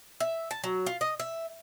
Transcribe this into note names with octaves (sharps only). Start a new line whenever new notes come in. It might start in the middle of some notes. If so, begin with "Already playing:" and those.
E5
A5
F#3
F4
D#5
E5